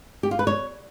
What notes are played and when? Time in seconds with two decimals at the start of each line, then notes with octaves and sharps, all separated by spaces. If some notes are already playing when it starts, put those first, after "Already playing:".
0.23 G4
0.31 F4
0.39 B4
0.47 C#5